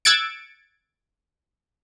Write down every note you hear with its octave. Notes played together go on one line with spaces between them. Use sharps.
E6 F#6 G#6 A6 C#7 D7